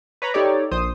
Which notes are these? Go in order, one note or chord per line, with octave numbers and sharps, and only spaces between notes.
B4 C#5 A#5 B5
D#4 G4 A4 C#5 D5
A#1 C5 D#6